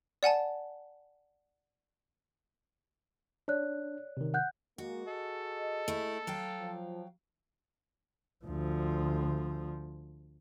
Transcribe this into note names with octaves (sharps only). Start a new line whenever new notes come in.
D5 F#5 G#5 A5
D4 C#5 D5 F#6
C3 D#3
F#5 F#6 G6
G#3 A#3 F#4
G#4 A4 D#5
A3 E4
F#3 F5 G5
F3
D2 F3